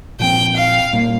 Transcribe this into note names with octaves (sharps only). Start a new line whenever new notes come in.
A#2 F3 C4 G5
F5
A#2 G3 A#3